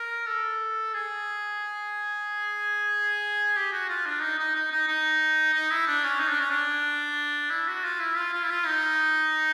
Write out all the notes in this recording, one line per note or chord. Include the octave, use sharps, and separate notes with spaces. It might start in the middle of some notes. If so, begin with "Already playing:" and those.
Already playing: A#4
A4
G#4
G4
F#4
F4
D4
D#4
D#4
D#4
D#4
D#4
D#4
E4
D4
C#4
D#4
D4
C#4
D4
E4
F#4
F4
E4
F4
F4
E4
F4
D#4